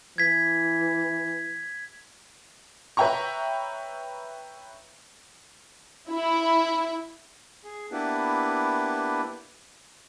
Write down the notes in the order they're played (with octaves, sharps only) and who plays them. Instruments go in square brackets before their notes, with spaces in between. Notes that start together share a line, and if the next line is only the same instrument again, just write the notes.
[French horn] E3 [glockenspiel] G#6 B6
[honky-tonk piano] B4 C#5 E5 G5 A#5 C#6
[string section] E4
[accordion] G#4
A#3 B3 D4 E4 G4 B4